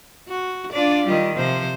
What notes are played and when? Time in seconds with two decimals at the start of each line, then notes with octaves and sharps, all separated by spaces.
0.29 F#4
0.73 D4 F4 D5
1.06 D#3 G3 F4 D#5
1.36 C3 F3 C5